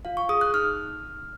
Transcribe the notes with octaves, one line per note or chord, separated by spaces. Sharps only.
F4 F5
C#6
G#4 D#6
F#6
D#4 F6